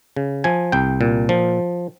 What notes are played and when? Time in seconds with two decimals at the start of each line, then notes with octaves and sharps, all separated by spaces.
0.16 C#3
0.44 F3 G#5
0.72 C2 G5
1.01 A#2
1.29 F3